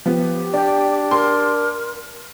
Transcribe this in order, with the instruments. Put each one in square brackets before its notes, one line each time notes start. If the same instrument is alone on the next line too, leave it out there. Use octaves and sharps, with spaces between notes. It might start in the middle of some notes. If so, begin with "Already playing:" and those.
[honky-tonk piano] F3 B3 [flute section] G4
[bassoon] D4 [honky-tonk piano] D5 [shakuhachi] G5
[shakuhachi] A#4 [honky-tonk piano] C6